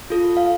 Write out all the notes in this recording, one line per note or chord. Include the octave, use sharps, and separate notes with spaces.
F4 A4
F5